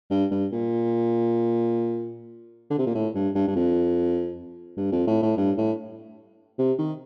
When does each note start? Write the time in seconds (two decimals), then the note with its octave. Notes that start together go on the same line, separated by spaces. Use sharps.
0.11 G2
0.31 G2
0.52 A#2
2.71 D3
2.78 C3
2.87 A#2
2.95 A2
3.15 G2
3.35 G2
3.48 G2
3.56 F2
4.77 G2
4.92 F2
5.07 A2
5.23 A2
5.37 G2
5.58 A2
6.59 C3
6.79 D#3